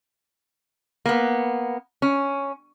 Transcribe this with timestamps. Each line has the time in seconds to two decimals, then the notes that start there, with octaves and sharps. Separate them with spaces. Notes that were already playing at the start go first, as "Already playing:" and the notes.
1.06 A#3 B3
2.02 C#4